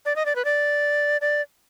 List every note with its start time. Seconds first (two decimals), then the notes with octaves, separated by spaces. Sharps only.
0.05 D5
0.16 D#5
0.26 D5
0.35 B4
0.45 D5
1.21 D5